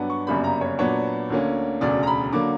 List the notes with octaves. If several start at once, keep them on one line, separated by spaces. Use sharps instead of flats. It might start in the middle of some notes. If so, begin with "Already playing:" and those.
Already playing: G2 F#3 B3 D4
C#6
G1 F#2 C#3 G3 A#3 B5
A#5
C#5
A#2 F#3 B3 D4 C#5
D2 D3 A#3 C#4
E1 D2 C#3 D5
A#5
B5
D3 F#3 A#3 D6